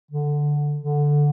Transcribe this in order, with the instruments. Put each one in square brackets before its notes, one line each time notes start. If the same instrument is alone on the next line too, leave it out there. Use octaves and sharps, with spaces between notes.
[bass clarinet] D3
D3